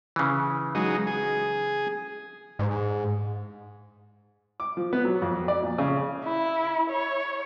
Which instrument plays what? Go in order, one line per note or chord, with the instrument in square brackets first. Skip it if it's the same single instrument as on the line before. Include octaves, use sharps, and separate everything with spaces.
[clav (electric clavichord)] C#3 E3
[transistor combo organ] F#3 G#3 D#4
G#4
[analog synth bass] G#2
[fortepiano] D6
F3
B3
F#3
F2
D5
A#2
C#3
[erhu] E4
C#5